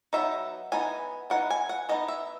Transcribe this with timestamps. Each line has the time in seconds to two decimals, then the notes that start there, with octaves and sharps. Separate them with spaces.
0.13 F#3 B3 D#4 E5
0.72 E3 B3 D#4 G#5
1.30 E3 B3 D#4 F#5
1.50 G#5
1.69 F#5
1.89 E3 B3 D#4 D#5
2.08 E5